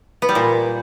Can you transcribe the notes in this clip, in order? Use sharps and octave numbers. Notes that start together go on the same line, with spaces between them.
B3
G3
A#2